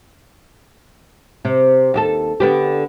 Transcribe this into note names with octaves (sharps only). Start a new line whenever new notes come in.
C3
D#2 F#4 A4
D3 B3 G4